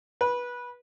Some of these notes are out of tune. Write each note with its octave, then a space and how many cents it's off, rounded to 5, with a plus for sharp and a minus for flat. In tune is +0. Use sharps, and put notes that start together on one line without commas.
B4 -20